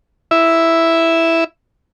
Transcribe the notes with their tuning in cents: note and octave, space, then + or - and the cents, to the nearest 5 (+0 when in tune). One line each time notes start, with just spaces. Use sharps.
E4 +0 E5 +0